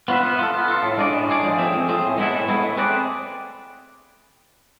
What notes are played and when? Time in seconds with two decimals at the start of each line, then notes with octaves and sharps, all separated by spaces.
0.08 B3 F4 B4 E5
0.24 B3
0.39 F4 A4
0.54 B3
0.68 F4 A4
0.83 A2
0.98 G#3 D4 G#4 D5
1.13 A2
1.29 G#3 D4 G#4 D5
1.43 F3
1.58 A3 C4 G#4
1.74 F3
1.88 A3 C4 G#4
2.03 A2
2.18 G#3 B3 E4 A4
2.33 A2
2.48 G#3 B3 E4 A4
2.63 A3
2.77 C4 G#4 B4 D5